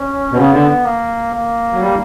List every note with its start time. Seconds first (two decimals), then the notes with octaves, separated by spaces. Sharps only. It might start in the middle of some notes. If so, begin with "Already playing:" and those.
Already playing: C#4
0.32 B2
0.37 C#3 B3
0.53 D3
0.85 A#3
1.33 A#3
1.73 F#3
1.81 G3